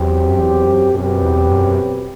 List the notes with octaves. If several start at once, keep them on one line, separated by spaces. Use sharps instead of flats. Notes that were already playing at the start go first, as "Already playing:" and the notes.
Already playing: E2 F#3 C4 G4 C5
F#2
E2
F#2
F#2 B2 F#3 C4 G4 B4
E2
F#2